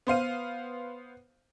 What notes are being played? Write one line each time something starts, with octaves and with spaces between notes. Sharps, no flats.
B3 C5 F5 D#7